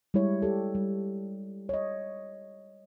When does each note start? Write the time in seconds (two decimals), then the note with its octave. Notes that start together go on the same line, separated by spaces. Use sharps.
0.14 G3 G#3 E4 C#5
0.42 G4 A4
0.75 G3
1.69 C#5 D#5